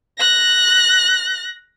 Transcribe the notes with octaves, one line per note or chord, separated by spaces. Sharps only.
F#6 A#6